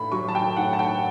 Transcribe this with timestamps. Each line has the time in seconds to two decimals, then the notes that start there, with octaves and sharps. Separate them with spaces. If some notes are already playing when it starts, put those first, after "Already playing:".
Already playing: A2 B5
0.12 F#3 C#6
0.29 A5
0.35 G5
0.57 A2 F#5
0.73 A5
0.79 G5